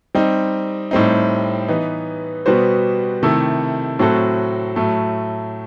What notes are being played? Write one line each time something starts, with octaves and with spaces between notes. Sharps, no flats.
G3 C4 D#4
A2 G3 C4 D#4
E3 B3 D#4
B2 G3 B3 F#4 C5
C3 D#3 A3 E4 A4
A2 F#3 C4 F#4 A4
A2 F#3 A3